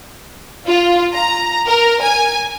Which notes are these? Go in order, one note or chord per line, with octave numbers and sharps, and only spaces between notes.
F4
A#5
A#4
G#5